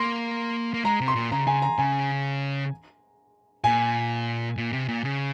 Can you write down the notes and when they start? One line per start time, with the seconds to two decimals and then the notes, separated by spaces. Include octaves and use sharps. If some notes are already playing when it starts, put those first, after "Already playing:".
Already playing: A#3 C6
0.74 A#3
0.85 G#3 A#5
1.01 C3
1.08 C6
1.15 A#2
1.32 C#3 A#5
1.47 C#3 G#5
1.62 A#5
1.78 C#3 G#5
3.64 A#2 G#5
4.57 A#2
4.73 C3
4.88 A#2
5.04 C#3